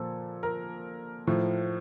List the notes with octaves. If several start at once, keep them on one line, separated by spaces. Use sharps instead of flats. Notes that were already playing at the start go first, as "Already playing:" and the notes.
Already playing: A#2 F3 A4
A#4
A2 F3